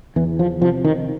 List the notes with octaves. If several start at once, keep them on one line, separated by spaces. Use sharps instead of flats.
E2 E3
F3
C3 F3
D#3